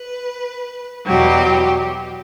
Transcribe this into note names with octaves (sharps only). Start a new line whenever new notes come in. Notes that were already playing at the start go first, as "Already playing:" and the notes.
Already playing: B4
E2 B2 F#3 G4